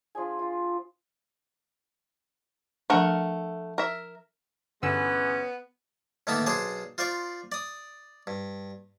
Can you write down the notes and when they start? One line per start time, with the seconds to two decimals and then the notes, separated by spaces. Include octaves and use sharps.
0.15 F3 D4 G#4 G#5
0.39 F4
2.90 F3 A3 D4 A#4 F#5
3.78 A#4 E5
4.83 G2 D3 E3 G#3 B3 C#4 E6
6.27 A2 D3 D#3 A#3 B3 A5
6.46 B1 D4 G#4 C5 A5 D6
6.98 F4 C5 D5 C#6 D6
7.52 D5 D#6
8.27 G2